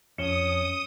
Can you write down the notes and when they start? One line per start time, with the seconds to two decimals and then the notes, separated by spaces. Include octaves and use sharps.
0.18 F2 C#4 D#6 C#7 E7 G7